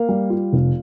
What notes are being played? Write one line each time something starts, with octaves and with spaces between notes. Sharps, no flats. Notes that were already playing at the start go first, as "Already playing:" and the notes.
Already playing: A#3 F5
G3
F4
F1